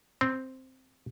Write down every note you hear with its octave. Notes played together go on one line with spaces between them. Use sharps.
C4